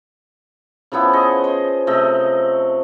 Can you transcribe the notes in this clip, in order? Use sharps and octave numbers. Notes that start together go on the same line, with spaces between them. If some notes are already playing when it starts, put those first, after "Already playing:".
C#3 F3 B3 E4
G#4 D#5 C#6
C5 D#5
C3 A3 D#5